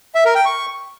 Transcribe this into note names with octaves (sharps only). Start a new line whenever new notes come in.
E5
A#4
G5
C#6